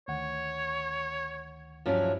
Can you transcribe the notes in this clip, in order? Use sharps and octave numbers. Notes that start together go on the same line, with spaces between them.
D2 D#3 C#5 F#5
G2 F3 F#3 C#4 E4